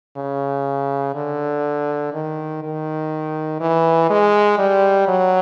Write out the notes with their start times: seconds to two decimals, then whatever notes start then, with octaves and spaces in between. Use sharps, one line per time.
0.17 C#3
1.15 D3
2.13 D#3
2.63 D#3
3.60 E3
4.10 G#3
4.59 G3
5.08 F#3